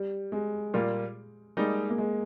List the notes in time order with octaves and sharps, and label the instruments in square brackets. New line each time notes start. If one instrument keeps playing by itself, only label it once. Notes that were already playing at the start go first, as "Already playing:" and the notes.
Already playing: [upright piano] G3
G#3
[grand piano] A#2 G3 A#3 F4
[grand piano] G3 A#3 D#4 [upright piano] G#3
[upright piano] A#3
G#3